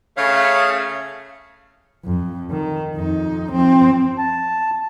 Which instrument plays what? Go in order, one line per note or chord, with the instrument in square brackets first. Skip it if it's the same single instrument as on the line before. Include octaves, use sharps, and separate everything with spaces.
[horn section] C#3 A3 [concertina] C#5 F5
[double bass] F2
D#3
F2 D#4
F3 C4
[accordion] A5